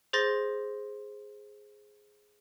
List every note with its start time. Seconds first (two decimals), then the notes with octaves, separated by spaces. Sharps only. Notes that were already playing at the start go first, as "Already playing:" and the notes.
0.13 G#4 C5 C6 A6 A#6